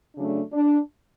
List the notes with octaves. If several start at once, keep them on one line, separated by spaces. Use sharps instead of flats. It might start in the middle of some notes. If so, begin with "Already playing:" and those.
C#3 F#3 A3 D4
D4